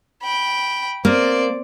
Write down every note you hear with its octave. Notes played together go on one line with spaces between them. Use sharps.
G5 B5
A#3 C4 D5